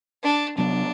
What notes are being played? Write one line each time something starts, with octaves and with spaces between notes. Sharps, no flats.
D4
C3 F#3 B3 D4